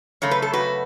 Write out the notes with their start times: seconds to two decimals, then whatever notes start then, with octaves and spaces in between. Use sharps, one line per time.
0.22 F#2 C#3 A3 C#5
0.31 B4
0.42 A4
0.53 F#4 B4